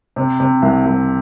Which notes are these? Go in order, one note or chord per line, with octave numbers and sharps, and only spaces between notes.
C3
C3
C2
C2